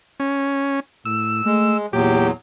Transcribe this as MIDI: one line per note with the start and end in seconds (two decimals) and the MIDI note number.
0.20 0.80 61
1.05 1.42 45
1.05 1.77 88
1.45 1.86 56
1.45 1.75 57
1.93 2.31 40
1.93 2.29 46
1.93 2.31 54
1.93 2.27 67